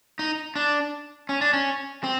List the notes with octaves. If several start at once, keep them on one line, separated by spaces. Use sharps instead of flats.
D#4
D4
C#4
D4
C#4
C4